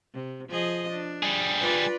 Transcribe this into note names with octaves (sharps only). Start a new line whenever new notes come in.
C3
F3 G#4 D#5
D4
G3 G#4
F4 B4 D5